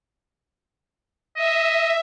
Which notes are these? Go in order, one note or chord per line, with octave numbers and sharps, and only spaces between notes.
D#5 E5